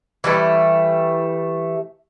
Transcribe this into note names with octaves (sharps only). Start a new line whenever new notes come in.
E3 G3 A3